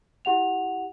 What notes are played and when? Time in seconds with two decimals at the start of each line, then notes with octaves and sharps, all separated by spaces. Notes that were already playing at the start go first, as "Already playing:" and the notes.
0.25 E4 G4 F#5 F7